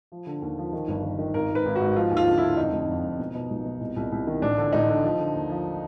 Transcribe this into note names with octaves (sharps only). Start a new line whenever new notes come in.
F3
D3
D#2
F3
D#3
G1
D#3
D#3
G#1 A#4
G#1 B4
G#1
G#2 F#4
F3 F4
D#2
F4
D3
D3 E4
F2 D#4
F1
F2
F1
B2
B2
B1
B2
C2
C2
C2
D#3
A1 D4
D3
A1 D#4
D3
F3
D3
D#2
F3